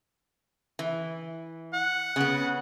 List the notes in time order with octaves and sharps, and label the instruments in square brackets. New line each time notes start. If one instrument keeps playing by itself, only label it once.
[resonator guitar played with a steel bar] E3
[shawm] F#5
[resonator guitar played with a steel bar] C#3 B3